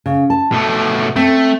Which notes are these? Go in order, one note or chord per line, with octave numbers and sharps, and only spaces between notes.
C#3
A5
B2 A3
A3 C4